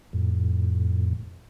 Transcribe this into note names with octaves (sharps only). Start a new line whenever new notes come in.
F2 A2